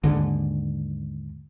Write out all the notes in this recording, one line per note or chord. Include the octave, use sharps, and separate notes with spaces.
D#2 G#2 D3